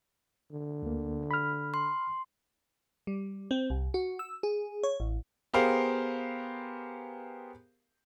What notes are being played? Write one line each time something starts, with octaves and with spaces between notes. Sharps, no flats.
D3
D2 A#3
B5 F6
C6
G3
C4
C2
F#4
E6
G#4
C#5
A1
B3 G4 G#4 A#4 C5 F5